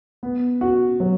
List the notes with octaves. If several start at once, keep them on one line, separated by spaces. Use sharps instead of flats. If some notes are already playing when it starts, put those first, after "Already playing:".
B3
F#4
F#3